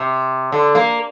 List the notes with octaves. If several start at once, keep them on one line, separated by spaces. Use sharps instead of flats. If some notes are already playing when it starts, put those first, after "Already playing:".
Already playing: C3
D3
A#3